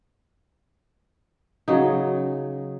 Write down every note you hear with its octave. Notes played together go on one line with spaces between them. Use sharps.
C#3 F#3 D#4